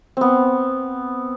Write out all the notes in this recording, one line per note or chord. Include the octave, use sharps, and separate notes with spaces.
B3 C4